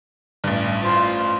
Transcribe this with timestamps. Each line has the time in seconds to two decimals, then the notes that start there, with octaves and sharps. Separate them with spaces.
0.44 A1 G2
0.82 F4 C5